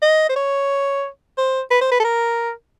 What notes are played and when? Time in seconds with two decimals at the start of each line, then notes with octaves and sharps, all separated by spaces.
0.02 D#5
0.29 C5
0.36 C#5
1.38 C5
1.71 B4
1.81 C5
1.92 B4
2.00 A4
2.04 A#4